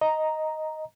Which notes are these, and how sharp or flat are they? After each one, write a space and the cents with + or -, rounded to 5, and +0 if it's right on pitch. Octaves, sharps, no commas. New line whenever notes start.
D#5 +5 A#5 +0